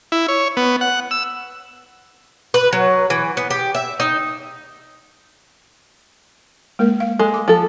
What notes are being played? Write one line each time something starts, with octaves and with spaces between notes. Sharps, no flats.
E4
C#5
B3
F#5
E6
B4
F#3
E3
B3
G4
E5
D#4
G#3 A#3 A#4
F5
G#3 A4
D6
F3 A4 A5